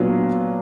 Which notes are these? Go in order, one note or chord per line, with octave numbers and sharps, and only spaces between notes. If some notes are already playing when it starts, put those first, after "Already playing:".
Already playing: A#2 F#3 B3 D4 F4